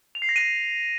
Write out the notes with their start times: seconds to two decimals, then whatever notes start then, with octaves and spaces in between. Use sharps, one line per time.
0.15 F7
0.22 C7
0.29 A#6
0.36 D#7